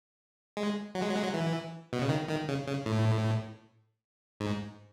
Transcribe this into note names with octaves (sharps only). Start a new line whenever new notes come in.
G#3
F#3
G#3
F#3
G#3
F#3
E3
B2
C#3
D#3
D#3
C#3
C#3
A2
G#2